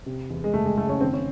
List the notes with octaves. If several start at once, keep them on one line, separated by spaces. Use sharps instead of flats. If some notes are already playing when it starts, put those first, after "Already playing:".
C3
E2
G#3
F#1 A3
G#3
F#1 A3
C#4
D#3 C4
C#4